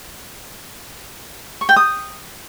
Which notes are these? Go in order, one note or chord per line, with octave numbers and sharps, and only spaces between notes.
C#6
G5
D#6